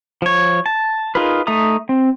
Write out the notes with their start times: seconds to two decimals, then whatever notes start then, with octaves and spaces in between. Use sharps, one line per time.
0.22 F3 C#5
0.66 A5
1.15 D#4 F4 G#4 A#4 B4
1.47 A3 D#4 E5 A#5 D#6
1.89 C4